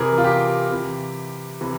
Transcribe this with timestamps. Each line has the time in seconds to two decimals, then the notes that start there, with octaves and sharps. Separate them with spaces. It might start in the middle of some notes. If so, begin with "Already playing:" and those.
Already playing: C3 E3 G#4 A#4
0.18 F4
0.24 G4
0.69 C3 E3
1.61 C3 E3